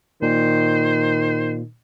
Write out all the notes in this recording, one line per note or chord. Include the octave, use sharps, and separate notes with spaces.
A#2 D#3 C5